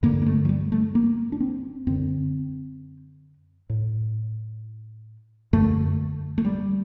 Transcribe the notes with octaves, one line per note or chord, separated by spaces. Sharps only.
G2 D3 A#3
A#3
A3
F#3
G3
A3
A#3
D4
C4
F#2 D3 C4
A2
F#2 D3 A3
A3
G3